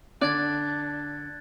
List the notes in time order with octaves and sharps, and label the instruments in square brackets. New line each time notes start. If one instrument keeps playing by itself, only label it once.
[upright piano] D3 [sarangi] D4 [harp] D5 [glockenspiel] F#6 G#6 A6